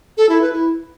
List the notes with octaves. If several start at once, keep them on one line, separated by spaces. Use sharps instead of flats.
A4
E4
B4
E4